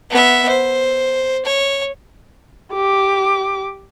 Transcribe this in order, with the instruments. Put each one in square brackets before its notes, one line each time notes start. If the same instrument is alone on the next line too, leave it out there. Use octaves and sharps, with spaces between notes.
[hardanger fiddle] B3 E5
C5
C#5
[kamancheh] G4 D6